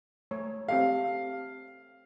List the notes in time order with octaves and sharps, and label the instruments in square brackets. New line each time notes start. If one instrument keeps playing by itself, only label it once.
[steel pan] A3 C#5
[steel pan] C4 G4 A4 [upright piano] F5